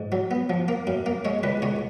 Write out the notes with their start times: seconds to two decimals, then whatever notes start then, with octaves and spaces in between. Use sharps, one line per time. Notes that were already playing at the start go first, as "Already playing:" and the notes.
Already playing: G#2
0.12 F#3
0.31 B3
0.50 F3
0.68 A#3
0.87 F#2
1.06 A#3
1.25 G#3 C#5
1.43 C#2 B4
1.62 C#2 C#5